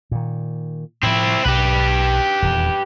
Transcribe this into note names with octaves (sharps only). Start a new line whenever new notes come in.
A#2 D#3
A2 F3 C4 E4
B1 G4 B4
D#1 E2